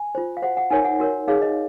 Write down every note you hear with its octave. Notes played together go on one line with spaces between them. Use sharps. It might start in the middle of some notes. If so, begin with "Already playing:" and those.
Already playing: G#5
F4 C5
F5
F#4 C5 F#5
F#5
D#4 A#4 C#5 G#5
F#5
F#4 A#4 C#5
D#4 G#4 C#5 F5
D#5